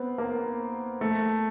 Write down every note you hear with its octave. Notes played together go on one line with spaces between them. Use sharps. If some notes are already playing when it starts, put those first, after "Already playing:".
Already playing: B3 C4
A#3
A3